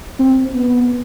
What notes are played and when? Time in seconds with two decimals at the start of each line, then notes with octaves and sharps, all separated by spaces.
0.19 C4
0.54 B3